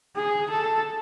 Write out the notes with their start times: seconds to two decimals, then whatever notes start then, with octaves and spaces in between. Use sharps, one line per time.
0.16 G#4
0.50 A4